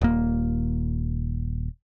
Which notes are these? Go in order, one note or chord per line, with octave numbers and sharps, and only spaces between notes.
D#1 A#3